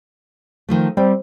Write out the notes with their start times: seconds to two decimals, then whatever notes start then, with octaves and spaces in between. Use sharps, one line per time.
0.69 D#3 F3 A3
0.97 G3 C4